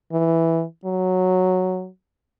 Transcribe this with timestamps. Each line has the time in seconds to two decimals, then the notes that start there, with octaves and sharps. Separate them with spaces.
0.12 E3
0.85 F#3